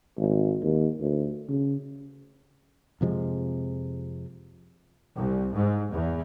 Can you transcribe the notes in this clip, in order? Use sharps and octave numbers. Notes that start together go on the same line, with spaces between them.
G#1
D#2
D2
C#3
F2 C3 F3 G#3
C2
G#2
E2